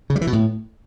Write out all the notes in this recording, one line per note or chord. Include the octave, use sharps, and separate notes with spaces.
C#3
G3
E3
B2
A2